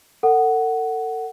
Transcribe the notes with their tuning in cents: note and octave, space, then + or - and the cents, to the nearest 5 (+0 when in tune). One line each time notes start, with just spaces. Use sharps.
A4 +40 F#5 +10